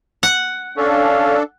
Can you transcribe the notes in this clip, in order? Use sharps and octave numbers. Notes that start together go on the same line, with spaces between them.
F#5
C#4 D4 A4 F5